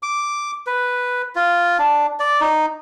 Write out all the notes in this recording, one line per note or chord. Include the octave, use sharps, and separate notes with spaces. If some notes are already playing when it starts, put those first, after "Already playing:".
D6
B4
F4
D4
D5
D#4